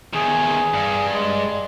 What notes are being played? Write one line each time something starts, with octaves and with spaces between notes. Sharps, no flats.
E2 D#3 G#4
G2
G#3